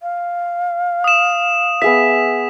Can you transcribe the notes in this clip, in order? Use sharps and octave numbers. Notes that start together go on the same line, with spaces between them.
F5
D#6 E7
B3 G#4 E5 B6